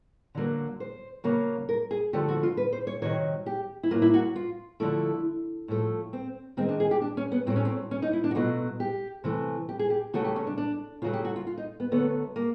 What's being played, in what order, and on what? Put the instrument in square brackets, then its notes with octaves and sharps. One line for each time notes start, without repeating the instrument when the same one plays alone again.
[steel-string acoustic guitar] D3 F#3 A#3
C5
C#3 F#3 A#3
A#4
G#4
D3 F3 A3 G4
F#4
F4
B4
C5
C#5
C3 D#3 F#3 C#5
G4
E4
A2 F#3 A#3 F4
E4
F#4
F4
D3 F3 A3 E4
A2 F3 A3
C4
D#3 G#3 C4
D4
G#4
G4
D4
C#4
B3
A2 F#3 A3 C4
C#4
C4
C#4
D#4
E4
D4
F#4
B2 F#3 A3 F4
G4
C3 E3 A3
G4
G#4
G4
C#3 F#3 A3 F#4
G4
C#4
D4
D4
C#3 F4
F#3 A3
G4
F#4
F4
F4
D#4
B3
D3 F#3 A3 B3
A#3